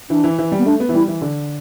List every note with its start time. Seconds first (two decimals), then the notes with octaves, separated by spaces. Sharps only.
0.10 E3 D4
0.24 E3
0.38 E3
0.52 G3
0.59 B3
0.66 A3 D4
0.80 B3
0.89 E3
0.94 G3 E4
1.08 E3
1.22 D3